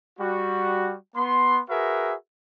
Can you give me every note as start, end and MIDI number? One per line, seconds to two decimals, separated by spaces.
0.20 0.94 55
0.20 0.94 66
1.16 1.59 59
1.16 1.59 84
1.70 2.14 66
1.70 2.14 68
1.70 2.14 70
1.70 2.14 71
1.70 2.14 76